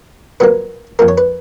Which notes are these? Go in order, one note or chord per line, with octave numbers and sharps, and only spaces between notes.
A#2 F#3 A#3 B4
F2 F3 A#3 A#4
C#5
B4